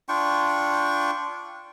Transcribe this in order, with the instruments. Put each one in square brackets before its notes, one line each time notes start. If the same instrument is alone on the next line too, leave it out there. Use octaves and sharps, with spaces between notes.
[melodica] D4 F4 G5 C#6